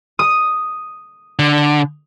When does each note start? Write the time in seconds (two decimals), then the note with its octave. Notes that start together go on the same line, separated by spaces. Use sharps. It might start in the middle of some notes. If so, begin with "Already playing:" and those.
0.19 D#6 D#7
1.39 D3